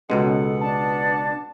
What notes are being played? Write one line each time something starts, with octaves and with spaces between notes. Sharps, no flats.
C#2 B2 G#3 B3 C#4 A4
D4 A5